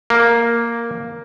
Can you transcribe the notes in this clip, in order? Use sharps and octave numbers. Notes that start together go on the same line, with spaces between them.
A#3